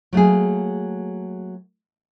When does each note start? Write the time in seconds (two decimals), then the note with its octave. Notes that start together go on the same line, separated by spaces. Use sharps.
0.13 F#3 A3 A#3 G#4